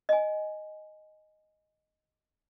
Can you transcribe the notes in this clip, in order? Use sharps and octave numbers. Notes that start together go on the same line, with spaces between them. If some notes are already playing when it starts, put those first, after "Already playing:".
D#5 G#5